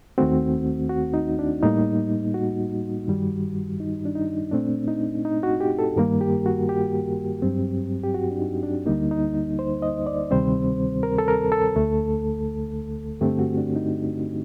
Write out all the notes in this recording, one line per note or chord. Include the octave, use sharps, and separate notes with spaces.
D#2 D#3 A3 C4 F#4
F#4
D#4
D4
A2 G3 A#3 D#4
F#4
G2 D#3 G3
D#4
D4
D#4
A#2 A3 C4 D4
D#4
D#4
F#4
G4
A4
G2 D#3 G3 A#3 A#4
G4
F#4
G4
G2 F#3 C4
G4
F#4
D4
D#4
D4
D2 D3 G3 A#3 D#4
D#4
D#4
C5
D#5
D5
D2 C3 D#3 G3 C4 C5
A#4
A4
A#4
A4
D2 D3 A3
G2 D3 A3 C4 G4
F#4
D4
D#4